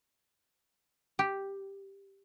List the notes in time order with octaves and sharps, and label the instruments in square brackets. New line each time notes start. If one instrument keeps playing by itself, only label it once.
[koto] G4